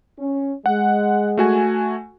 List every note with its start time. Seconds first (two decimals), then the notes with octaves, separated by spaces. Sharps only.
0.18 C#4
0.66 G#3 F#5
1.37 A3 F#4 G#5